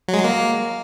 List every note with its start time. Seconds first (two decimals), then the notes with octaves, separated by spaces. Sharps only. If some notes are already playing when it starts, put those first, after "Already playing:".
0.08 F#3
0.14 G#3
0.19 F#3
0.24 A#3